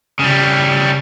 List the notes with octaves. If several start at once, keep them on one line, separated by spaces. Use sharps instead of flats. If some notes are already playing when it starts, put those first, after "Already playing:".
C#3 G3